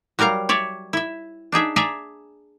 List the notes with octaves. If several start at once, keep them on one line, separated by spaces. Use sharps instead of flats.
F#3 G3 A#4 F5 A#5
C#5 D5 E5
E4 E5
D4 D#4 G#4 E5
G#4 D5 E5 G#5 A#5